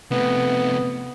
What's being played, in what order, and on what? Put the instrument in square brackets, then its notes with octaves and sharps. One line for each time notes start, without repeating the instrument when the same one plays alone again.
[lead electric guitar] C3 A3 [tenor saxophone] B3